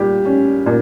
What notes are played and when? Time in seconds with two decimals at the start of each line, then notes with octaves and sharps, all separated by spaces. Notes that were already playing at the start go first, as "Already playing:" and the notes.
Already playing: A#2 G3 G4
0.25 C#4
0.66 A#2